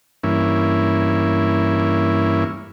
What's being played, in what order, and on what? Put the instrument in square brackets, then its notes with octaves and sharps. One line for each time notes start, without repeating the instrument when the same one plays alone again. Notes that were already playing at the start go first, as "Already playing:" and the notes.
[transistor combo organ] G2 E3 A#3 C#4 E4